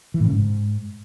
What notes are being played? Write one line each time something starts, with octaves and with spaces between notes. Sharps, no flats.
E3
A2
C#3
G#2